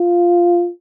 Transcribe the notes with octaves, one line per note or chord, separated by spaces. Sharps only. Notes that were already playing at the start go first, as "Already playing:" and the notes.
Already playing: F4